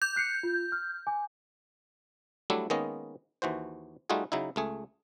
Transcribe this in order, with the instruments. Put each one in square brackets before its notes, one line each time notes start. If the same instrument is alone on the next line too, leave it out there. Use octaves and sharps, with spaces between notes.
[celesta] D6 [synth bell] G6
[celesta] F#6 C7 C#7
F4
F6
G#5 D6
[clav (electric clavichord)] F#3 G3 A3 D4 E4
D#3 G#3 A#3 B3 C#4 D#5
D#2 E3 F#4 C5
G3 A3 D#4 F4 F#4 G#4
C#3 F#3 D#4 E4
C#2 A3 G#4